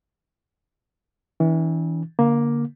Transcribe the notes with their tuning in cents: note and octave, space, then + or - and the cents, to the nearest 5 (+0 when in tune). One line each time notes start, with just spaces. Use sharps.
E3 -25 C#4 +40
D3 -30 A#3 +10